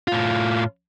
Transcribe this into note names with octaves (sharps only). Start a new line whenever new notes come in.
A2 F4